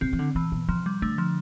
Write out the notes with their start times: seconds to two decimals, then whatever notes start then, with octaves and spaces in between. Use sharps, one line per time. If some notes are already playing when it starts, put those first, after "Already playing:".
0.01 C3 C4
0.13 E3
0.19 D3
0.35 C3 E3
0.52 B2
0.69 C3 F3
0.86 G3
1.02 D3 A3
1.18 F3